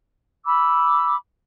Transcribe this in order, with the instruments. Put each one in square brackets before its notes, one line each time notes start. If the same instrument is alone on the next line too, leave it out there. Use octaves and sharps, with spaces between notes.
[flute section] B5 D6 E6